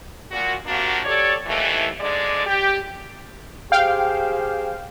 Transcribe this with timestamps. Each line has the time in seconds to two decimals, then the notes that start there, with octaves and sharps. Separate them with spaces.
0.32 A#2 F#4
0.66 C3 F3 A#3 D4 F#4
1.05 G4 A4 C#5 D5
1.46 D#2 E3 A3
1.99 G#2 D3 G#3 D5
2.46 G4
3.72 G4 G#4 C5 F5 G5